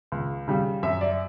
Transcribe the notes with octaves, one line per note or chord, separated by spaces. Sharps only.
C#2
C#3 G3
F#2 E5
D5